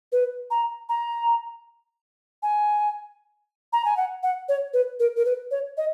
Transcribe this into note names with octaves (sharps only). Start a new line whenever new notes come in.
B4
A#5
A#5
G#5
A#5
G#5
F#5
F#5
C#5
B4
A#4
A#4
B4
C#5
D#5